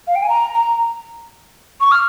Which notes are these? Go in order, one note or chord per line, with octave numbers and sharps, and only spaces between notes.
F5
G5
G#5
A#5
A#5
C#6
F6